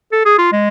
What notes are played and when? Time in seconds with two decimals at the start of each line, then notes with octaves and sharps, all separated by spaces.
0.12 A4
0.25 G#4
0.38 F4
0.52 G#3